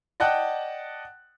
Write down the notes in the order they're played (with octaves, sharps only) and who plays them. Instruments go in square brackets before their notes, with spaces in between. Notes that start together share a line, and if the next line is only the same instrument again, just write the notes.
[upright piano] D5 D#5 F#5 G5 A5 F#6